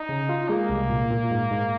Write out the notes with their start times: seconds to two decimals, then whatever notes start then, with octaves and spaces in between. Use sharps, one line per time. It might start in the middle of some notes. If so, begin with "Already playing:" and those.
Already playing: D#4
0.09 C#3
0.29 F4
0.49 G#3 A#3
0.70 C2
0.90 A#2
1.11 A#2
1.31 G#2
1.51 G#2